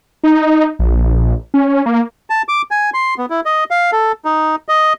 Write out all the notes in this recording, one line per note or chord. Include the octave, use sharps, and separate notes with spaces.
D#4
A#1
C#4
A#3
A5
D6
G#5
C6
B3
E4
D#5
F5
A4
D#4
D#5